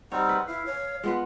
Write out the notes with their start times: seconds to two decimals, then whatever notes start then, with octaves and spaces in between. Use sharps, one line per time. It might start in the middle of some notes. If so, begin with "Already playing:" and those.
0.12 G3 C4 D#4 C#5 F#5
0.29 B4
0.47 E4 F5
0.66 C#5
1.04 G#3 B3 F4 B4